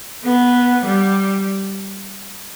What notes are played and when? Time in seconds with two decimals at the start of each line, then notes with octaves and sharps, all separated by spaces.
0.25 B3
0.85 G3